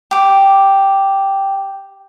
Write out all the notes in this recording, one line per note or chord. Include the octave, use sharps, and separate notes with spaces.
G4 D6